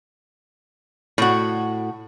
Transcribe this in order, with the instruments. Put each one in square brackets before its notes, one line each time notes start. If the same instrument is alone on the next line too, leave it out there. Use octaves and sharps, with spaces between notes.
[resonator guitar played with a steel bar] A2 F#4